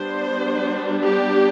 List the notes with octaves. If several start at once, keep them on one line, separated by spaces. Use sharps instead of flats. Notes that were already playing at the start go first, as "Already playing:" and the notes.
Already playing: G3 B3 D4 C5
G4